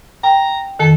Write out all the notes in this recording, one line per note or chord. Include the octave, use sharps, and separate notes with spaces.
G5 A#5
F2 D#3 A4